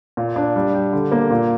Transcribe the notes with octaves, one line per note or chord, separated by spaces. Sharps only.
A#2
D4
G3
G4
D3
A#3
A#2